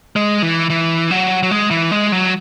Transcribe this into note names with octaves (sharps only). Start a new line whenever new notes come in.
G#3
E3
E3
F#3
F#3
G#3
E3
G#3
F#3